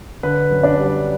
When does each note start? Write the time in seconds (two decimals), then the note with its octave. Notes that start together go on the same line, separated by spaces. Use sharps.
0.23 D3 B4
0.51 F#2
0.63 D4 D5
0.77 G3